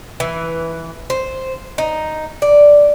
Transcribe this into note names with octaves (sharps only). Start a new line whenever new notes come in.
E3
C5
D#4
D5